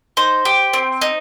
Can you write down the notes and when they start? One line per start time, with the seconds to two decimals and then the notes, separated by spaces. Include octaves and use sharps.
0.17 D#4 C5
0.45 G4
0.73 C4
1.02 D#4